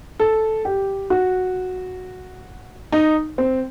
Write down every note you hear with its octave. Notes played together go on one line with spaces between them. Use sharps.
A4
G4
F#4
D#4
C4